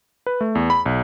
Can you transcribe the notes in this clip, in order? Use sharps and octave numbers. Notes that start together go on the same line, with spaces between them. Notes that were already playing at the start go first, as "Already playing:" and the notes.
B4
A3
E2
B5
B1